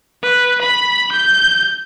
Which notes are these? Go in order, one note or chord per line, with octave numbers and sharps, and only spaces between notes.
B4
B5
G6